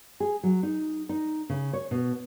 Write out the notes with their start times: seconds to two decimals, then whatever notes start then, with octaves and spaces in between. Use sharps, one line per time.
0.20 G#4
0.43 F#3
0.63 D#4
1.09 D#4
1.50 C#3
1.73 C#5
1.91 B2